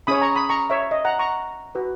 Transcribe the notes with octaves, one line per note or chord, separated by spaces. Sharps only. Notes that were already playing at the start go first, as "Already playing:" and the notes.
C#4 G#4 C#5 B5 D#6
A#5 C#6
B5 D#6
A#5 C#6
C#5 E5
D#5
F#5 A#5
A#5 C#6
F#4 B4